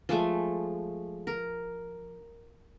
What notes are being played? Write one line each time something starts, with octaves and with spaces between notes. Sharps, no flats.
F3 G#3 A3 G#5
A#4